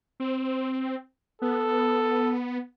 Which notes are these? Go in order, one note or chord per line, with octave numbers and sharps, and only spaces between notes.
C4
B3 A4